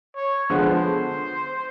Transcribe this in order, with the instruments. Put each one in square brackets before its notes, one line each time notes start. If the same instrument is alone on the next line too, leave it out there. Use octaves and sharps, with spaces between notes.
[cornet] C#5
[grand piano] D3 F3 G#3 B3 [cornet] C5